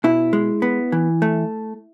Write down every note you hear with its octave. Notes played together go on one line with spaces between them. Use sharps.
B2 E4
G#3
B3
E3
A3